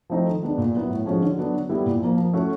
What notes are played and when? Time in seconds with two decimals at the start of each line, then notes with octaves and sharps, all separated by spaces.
0.10 F3 A3 C4 D#4
0.26 D#3
0.43 G#3 B3 D4
0.58 A#2
0.74 F#3 B3 E4
0.89 A2
1.06 F3 G#3 C#4 F#4
1.22 D3
1.38 F#3 B3 D4
1.54 D3
1.69 G3 B3 E4
1.86 A#2
2.01 F3 A#3
2.17 F3
2.33 A3 C#4 F#4